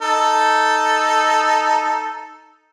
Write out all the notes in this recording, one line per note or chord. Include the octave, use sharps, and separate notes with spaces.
D#4 A4